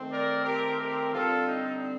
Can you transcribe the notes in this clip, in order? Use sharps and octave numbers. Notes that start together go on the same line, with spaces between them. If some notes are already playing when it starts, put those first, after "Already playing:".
Already playing: D#3 A3 C4
A#4 D5
G4 A#4
G4 A#4
D3 G3 C4 F4 A4
D#4